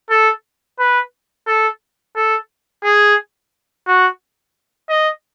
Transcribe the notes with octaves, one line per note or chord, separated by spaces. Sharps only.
A4
B4
A4
A4
G#4
F#4
D#5